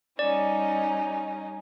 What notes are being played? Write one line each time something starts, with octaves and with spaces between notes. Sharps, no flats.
G3 C#4 D#4 D5